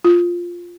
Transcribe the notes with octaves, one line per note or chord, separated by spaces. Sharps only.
F4